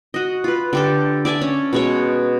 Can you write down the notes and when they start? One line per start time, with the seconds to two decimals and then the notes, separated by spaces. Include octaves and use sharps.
0.14 F#4 D#5
0.44 F4 B4
0.73 D3 G4 A4
1.25 D5 E5 G#5 A5
1.41 C#4
1.73 B2 G#3 C#5